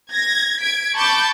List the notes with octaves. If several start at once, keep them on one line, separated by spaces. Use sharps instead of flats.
G#6 A#6
G#6 B6 D7
A5 B5 C#6 D6 G6 A6